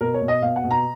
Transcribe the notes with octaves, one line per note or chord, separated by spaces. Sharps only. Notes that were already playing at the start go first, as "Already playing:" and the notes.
B2 A#4
C#5
B2
D#5
B2 F5
F#5
B2
A#5